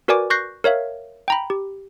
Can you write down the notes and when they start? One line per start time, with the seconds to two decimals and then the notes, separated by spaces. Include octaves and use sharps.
0.08 F#4 A#4 B4 D5 G#5 D6
0.30 C#6 F#6 G6 A#6 C7
0.64 A#4 C#5 E5 F5
1.28 G5 A#5 B5
1.50 G4